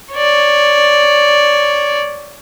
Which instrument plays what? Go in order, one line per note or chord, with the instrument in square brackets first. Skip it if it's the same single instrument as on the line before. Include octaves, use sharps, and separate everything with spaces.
[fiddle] C#5 D5